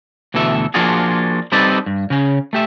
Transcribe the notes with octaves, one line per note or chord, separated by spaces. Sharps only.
D2 B2 E3 A4 E5
F3 A#3 D4 F4 F#4 G#4
G3 C4 D#4 A4 B4 D5
G2
C#3 C#4
A3 G4 E5